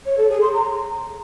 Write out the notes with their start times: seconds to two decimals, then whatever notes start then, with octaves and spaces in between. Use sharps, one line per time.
0.06 C#5
0.18 A4
0.30 G#4
0.42 C6
0.53 A#5